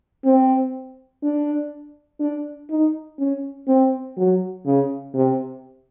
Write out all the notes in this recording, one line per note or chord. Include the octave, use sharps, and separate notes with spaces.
C4
D4
D4
D#4
C#4
C4
F#3
C#3
C3